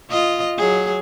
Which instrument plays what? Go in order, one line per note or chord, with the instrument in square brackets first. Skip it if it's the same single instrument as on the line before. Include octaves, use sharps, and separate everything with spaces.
[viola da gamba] F4 D#5
F#3 G#4